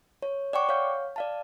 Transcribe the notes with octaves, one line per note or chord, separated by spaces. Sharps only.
C#5
D5 F#5 G5 C#6 D6
C#5 F5 G6
D5 F5 A5